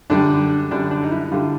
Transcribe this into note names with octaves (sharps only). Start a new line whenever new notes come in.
F#2 D3 G3 D4
F#2 D3 G3 D4
D4
D#4
E4
D3 G3 F4